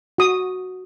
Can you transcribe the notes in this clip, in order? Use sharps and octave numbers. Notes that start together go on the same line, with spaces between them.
F#4 D#6